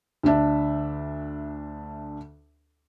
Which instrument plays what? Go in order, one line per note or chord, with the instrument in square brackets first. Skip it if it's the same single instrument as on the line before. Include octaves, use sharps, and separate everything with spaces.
[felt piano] D2 D3 D4 E5